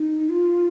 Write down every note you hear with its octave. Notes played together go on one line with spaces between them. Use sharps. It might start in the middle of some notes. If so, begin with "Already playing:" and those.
Already playing: D#4
F4